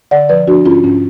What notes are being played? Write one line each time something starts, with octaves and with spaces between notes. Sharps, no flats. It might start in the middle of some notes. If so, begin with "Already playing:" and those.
D3 D5 F#5
F3 B4 D5
F3 D4 F#4
G#2 C#4 F4
G#2 C#4